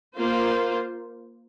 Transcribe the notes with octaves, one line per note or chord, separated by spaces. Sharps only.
A#3 F4 C5